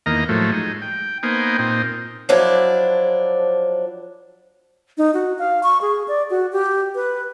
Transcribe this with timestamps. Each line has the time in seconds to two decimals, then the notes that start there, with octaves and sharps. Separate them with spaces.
0.06 E2 D#3 A#3 D#5 A#5
0.29 A2 F3 F#3 A3
0.52 G#3 D#4
0.82 G5
1.23 A#3 B3 D#4 C5 G5 G#5
1.59 A#2 C4 D#4
2.29 F3 F#3 D4 E4
4.98 D#4
5.14 F#4
5.39 F5
5.63 C#6
5.82 G#4
6.08 D5
6.30 F#4
6.52 G4
6.95 B4